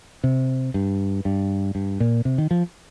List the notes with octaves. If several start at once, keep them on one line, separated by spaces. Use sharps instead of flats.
C3
G2
G2
G2
A#2
C3
D#3
F3